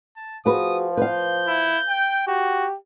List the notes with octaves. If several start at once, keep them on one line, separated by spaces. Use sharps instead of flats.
A5
F3 F#4 G#4 B4 D#6
B4 F5 G6
E4
G5
F#4 G4